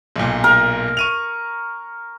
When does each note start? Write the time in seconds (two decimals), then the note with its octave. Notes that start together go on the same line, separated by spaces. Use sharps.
0.16 B1 A#2
0.44 A#4
0.97 C#6 D#7 F7